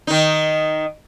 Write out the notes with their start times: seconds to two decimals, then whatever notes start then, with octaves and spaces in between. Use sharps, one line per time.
0.07 D#3 D#4